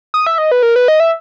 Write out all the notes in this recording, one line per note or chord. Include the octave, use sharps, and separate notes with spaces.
D#6
E5
D#5
B4
A#4
B4
D#5
E5